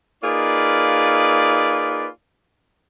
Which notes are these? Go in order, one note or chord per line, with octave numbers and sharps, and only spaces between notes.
A#3 D#4 F4 G#4 B4 D5